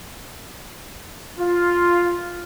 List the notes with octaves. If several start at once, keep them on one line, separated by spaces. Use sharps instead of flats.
F4